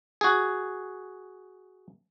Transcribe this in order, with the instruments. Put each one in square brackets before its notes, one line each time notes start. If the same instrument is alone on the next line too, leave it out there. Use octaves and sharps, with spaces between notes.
[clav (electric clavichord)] F#4 G#4